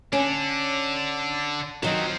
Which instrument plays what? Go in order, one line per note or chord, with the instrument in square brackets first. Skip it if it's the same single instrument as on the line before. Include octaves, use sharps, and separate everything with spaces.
[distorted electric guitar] D3 D4 [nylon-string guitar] C#4
[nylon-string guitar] D#3 F#3 [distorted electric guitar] F3 C4